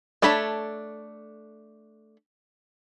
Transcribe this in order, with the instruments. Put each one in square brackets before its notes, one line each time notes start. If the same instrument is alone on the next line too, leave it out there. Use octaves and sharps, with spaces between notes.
[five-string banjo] A3 D4 A4 C#5 B5